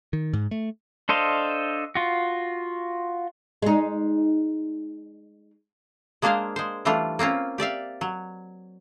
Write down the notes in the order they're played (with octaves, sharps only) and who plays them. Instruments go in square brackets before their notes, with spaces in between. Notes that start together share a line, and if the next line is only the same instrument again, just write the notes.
[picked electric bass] D#3
G#2
A3
[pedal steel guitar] D4 A4 C5 D#5 F5
F4 F#4
[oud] G#3 D#4
[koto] G#3 A#3 D4 G#4 C5 F5
G#3 C5
E3 G3 A3 D4 F4
A#3 C4 C#4 F4
G4 D5 E5 F5
F#3